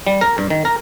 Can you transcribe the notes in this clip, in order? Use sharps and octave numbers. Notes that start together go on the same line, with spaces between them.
G3
A#4
G2
D#3
A#4